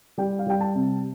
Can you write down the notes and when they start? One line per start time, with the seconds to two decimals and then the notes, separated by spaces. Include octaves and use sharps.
0.18 G3 G5
0.39 F5
0.47 G3 G5
0.61 A5
0.75 C3